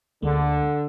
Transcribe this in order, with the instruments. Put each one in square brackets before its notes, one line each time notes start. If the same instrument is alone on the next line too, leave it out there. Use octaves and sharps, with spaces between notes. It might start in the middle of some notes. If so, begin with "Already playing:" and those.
[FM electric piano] D2 G#3 A#3 [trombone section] D3